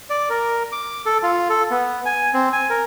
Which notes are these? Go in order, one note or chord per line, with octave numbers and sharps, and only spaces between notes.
D5
A#4
D6
A4
F4
A4
B3
G#5
C4
G#5
A#4